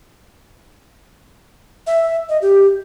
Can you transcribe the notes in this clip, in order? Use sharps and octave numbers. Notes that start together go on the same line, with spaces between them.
E5
D#5
G4